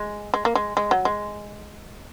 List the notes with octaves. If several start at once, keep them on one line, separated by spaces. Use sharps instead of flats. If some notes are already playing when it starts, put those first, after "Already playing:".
Already playing: G#3
G#3
A#3
G#3
G#3
F#3
G#3